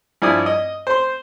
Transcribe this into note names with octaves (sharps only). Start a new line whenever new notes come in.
G2 F3 E4 D5 G#5 D#6
D#5
C5 C6